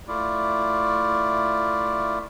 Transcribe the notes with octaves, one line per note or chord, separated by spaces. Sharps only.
A3 E4 F4 D5